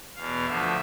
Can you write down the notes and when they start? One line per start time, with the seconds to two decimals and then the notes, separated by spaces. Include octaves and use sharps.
0.15 E2 B2 F5
0.45 D2 D3 F3 E5